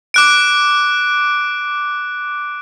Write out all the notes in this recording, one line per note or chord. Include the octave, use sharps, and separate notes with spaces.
D6 F#6 D7